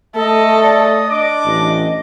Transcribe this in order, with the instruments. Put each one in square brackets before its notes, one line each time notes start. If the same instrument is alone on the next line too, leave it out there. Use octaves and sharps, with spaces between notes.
[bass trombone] A3 [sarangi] A4 [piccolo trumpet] D#5
[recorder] D5
[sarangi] D4 [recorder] D#5 [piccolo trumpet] D6
[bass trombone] A1